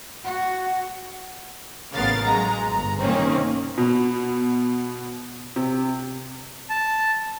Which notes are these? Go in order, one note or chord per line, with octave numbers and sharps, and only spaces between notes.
F#4 F#5
A1 C#3 B3 A#4 F5 A6
F#3 G#3 A#5
G1 A#5
C3 D#3 A#3 C4 C#4
B2
C3
A5